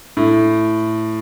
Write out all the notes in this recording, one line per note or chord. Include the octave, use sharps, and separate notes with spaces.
A2